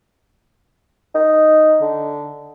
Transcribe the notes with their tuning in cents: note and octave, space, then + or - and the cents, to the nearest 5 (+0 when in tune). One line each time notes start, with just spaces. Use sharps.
D#4 +0
D3 -5